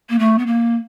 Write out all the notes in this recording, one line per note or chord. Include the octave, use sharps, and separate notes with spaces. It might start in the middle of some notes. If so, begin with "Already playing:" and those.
A#3
A3
B3
A#3